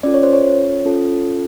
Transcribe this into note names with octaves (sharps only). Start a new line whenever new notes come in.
C#4 F4 A4 D5
C#5
C5
C#5
C#4 F4 A4